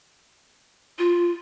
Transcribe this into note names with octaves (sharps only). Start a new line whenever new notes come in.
F4